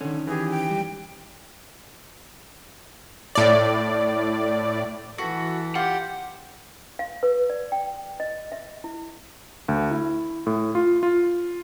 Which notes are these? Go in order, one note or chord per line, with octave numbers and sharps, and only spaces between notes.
D3 D#3 C#4
E3 G4 G#4
G5
G3
A2 D5
E3 F#4 A4
F4 G4 F#5
F5
B4
D5
G5
D#5
E5
E4
D2
E4
A2
F4
F4